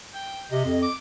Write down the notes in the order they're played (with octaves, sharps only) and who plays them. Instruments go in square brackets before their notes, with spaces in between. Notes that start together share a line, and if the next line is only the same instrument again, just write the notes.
[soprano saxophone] G5
[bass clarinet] C3 [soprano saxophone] D#5
[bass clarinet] F2
[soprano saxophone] D6